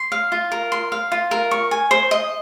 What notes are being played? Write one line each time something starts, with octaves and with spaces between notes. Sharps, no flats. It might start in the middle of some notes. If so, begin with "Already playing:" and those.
Already playing: C6
F5
F4
A#4
C6
F5
F4
A#4
C#6
G#5
C5
D#5